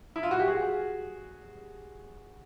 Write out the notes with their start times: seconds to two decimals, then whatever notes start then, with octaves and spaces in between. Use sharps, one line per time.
0.16 E4
0.23 F4
0.31 F#4
0.40 G4
0.48 F#4 G#4